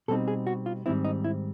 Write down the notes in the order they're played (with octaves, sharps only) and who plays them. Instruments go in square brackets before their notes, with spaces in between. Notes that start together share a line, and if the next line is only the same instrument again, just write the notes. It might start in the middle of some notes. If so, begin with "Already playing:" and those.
[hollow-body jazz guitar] B2 G3 C4 D#4 A4
G#4
F#4
F4
G#2 D#3 G3 C4 E4
D#4
E4